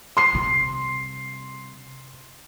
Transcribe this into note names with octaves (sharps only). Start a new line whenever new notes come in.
C6 C7
C3 G3